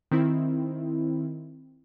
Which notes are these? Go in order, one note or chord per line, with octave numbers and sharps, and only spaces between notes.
D#3 C4 E4